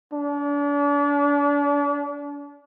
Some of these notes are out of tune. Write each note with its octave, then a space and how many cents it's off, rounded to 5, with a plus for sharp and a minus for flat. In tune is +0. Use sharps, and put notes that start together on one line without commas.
D4 -40